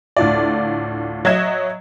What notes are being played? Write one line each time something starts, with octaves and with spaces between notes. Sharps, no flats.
D2 A2 F4 D5
F#3 D#5 E5 G#6 E7